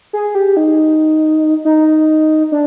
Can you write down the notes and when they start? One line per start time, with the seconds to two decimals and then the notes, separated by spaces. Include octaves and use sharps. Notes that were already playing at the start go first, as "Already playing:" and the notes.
0.13 G#4
0.35 G4
0.57 D#4
1.65 D#4
2.52 D4